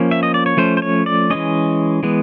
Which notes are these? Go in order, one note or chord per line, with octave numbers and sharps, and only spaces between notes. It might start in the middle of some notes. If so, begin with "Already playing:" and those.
Already playing: F3 A#3 C#4 C5
E5
D#5
D5
C#5
F3 A3 C#4 C5
C5
C#5
D5
E3 G#3 C#4 D#5
E3 G#3 B3